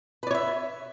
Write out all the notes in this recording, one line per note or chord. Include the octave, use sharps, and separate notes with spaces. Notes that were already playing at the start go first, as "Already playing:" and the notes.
B4 C#5 D5 E5